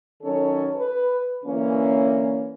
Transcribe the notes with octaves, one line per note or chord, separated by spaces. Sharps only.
D#3 F#3 C#4 A4 C#5
B4
D3 E3 A#3 C#4